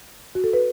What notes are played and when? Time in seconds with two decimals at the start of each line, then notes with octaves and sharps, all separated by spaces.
0.35 F#4
0.44 A4
0.53 B4